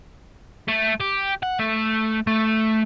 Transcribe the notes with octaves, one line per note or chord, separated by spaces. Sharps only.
A3
G4
F#5
A3
A3